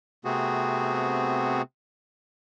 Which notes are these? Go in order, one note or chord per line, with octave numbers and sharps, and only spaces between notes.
C3 A3 B3 C4 F#4 G#4